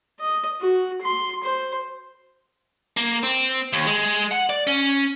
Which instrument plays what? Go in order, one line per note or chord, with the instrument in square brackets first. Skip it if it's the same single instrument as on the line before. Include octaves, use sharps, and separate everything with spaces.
[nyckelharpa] D#5
F#4
C6
C5
[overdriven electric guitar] A#3
C4
D#2
G#3
F#5
D5
C#4